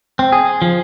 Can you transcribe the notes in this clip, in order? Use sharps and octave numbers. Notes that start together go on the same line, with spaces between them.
C4
G#4
F3